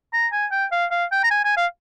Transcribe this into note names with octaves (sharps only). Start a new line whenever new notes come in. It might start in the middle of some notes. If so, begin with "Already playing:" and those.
A#5
G#5
G5
F5
F5
G5
A#5
G#5
G#5
F5